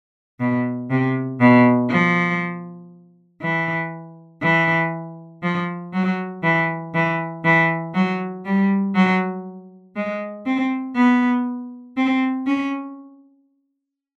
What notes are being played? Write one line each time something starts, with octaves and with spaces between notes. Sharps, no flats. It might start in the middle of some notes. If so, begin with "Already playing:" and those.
B2
C3
B2
F3
E3
E3
F3
F#3
E3
E3
E3
F#3
G3
F#3
G#3
C4
B3
C4
C#4